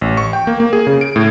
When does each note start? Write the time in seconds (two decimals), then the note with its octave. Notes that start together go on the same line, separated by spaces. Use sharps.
0.01 A1
0.17 C#6
0.33 G5
0.47 A#3
0.60 A#3
0.73 G#4
0.87 C#3
1.01 D7
1.16 A2